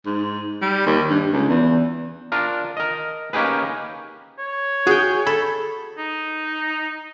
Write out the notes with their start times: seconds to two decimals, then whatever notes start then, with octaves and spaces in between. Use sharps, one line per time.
0.06 G#2
0.62 G3
0.86 D#2
1.10 G2
1.33 C#2
1.49 E2
2.32 D4 F4 A#4
2.77 A#4 D#5
3.33 A#3 C#4 D#4 G4 G#4 B4
4.39 C#5
4.87 F#4 G#4 G5
5.27 A4 B5
5.98 D#4